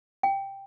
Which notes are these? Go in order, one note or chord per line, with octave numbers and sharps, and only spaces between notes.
G5